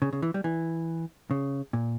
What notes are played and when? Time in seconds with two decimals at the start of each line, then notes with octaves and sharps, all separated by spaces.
0.02 C#3
0.13 C#3
0.22 E3
0.34 G3
0.44 E3
1.31 C#3
1.73 A#2